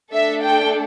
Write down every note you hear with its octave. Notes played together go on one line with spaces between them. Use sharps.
A3 D4 A4 E5
G5